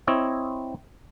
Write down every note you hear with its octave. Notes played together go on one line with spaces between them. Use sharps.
C4 E4 C#5 D#5